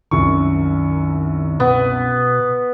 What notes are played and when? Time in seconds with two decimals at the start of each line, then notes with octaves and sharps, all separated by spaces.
0.11 C2 F#2 D#3 C#6
1.60 B2 B3